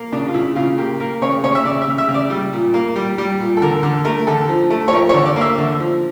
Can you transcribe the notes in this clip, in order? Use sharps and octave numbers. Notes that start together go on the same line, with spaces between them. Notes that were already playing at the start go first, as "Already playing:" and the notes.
Already playing: A#3
C#3 D4
F4
C#3 E4
C#3 F4
A#3 G4
A#3 A#4
C#3 C#5
C#3 C#5
E5
C#3 D5
E5
C#3
E5
C#3
D5
G3
A#2
A#3
G3
G3
A#2
A4
D3 A#4
D3
A3 A#4
D3 A4
F3
A3
C#5
F3 A#4
D3 C#5
D5
A#3 E5
D3
F3